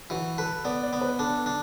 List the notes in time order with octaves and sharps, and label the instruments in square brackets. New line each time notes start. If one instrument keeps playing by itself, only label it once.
[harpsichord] E3 [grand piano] F#4
[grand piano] A4 [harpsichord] B4
[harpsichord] B3 [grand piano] D5
[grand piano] D5
[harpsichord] B3
[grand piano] B4
[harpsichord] D4 [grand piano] A4
[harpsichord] D4